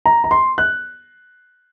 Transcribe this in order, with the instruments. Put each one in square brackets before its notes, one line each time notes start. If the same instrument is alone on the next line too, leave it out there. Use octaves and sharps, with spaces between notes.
[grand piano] A#5
A#5
C6
F#6